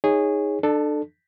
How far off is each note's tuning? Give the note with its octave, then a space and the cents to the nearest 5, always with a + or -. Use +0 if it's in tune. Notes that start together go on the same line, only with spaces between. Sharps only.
D#4 +10 G#4 -15 C#5 +0
D4 +30 A4 +0